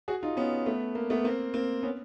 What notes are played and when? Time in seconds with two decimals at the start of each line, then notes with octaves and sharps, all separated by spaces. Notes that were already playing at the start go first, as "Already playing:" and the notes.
0.08 F#4 G#4
0.23 D#4 F4
0.37 B3 C#4
0.66 A3 B3
0.95 A#3
1.10 A3 B3
1.24 A#3 C4
1.54 A#3 C4
1.83 B3 C#4